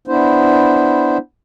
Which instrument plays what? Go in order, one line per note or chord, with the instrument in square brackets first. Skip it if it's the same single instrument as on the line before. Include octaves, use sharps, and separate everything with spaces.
[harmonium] B3 D4 E4 C5